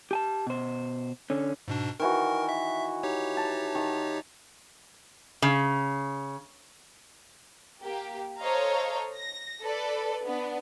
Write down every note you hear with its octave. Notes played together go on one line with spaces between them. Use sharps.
G4 G#5 A5
B2 C5
D3 C#4
G#2 B2 D4
D#3 E3 F#4 A#4
E5
D#4 G4 C#5
A5
D#3
C#3
A#3 G4
A4 C5 C#5 D#5 F5 A#5
A#6
A4 B4 D5
B3 D4